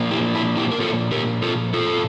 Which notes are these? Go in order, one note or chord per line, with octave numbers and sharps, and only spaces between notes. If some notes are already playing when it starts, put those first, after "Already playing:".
Already playing: A#2 F3 A#3
E4 G4
E4
E4 G4
A#4
F4 A4
G4 A#4
F4 A4
F4 A4